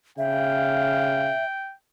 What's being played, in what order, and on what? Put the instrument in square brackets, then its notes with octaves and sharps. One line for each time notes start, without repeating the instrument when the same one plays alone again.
[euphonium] C#3 [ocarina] E5 [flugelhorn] F5 [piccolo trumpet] G5